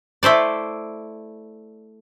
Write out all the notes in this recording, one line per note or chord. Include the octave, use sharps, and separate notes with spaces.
A3 E4 C5 D5